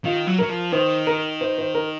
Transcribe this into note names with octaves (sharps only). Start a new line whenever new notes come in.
D#3 F4
F#3
F#3 A#4
F3
D#3 C5
A#4
C5
C5
A#4